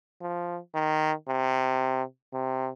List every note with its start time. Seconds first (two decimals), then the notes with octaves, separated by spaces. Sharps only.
0.22 F3
0.75 D#3
1.29 C3
2.33 C3